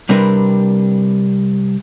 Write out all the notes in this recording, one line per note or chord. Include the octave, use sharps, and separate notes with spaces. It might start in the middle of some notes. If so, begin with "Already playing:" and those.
C3 G3 C4 D4 A#4 B4